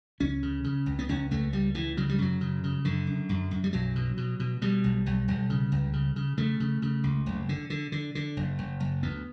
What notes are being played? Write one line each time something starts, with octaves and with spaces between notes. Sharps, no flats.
C#2 C#4
C#3
C#3
C#2
B3
C#2 C#4
C#2 A3
C#2 G3
C#2 E3
C#3 F#3
G3
F#2 F#3
C#3
C#3
F#2 D3
F#2
F#2
F#2
G3
B1 F#3
B2
B2
B2
B2 G3
B1
B1
B1
C#3
C#2
C#3
C#3
C#3 A3
C#3
C#3
C#2
F#1
D3
D3
D3
D3
F#1
F#1
F#1
D2 B3